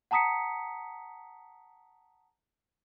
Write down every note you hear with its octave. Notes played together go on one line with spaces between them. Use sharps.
F#5 A5 A#5 D#6 B6 C#7